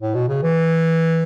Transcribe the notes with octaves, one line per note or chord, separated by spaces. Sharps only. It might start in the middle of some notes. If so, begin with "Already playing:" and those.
A2
B2
C#3
E3